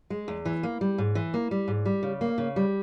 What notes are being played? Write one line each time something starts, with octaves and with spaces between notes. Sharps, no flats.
G#3
E2
E3
A#3
G3
G#2
E3
A#3
G3
G#2
G3
C#3
A#3
C#3
G3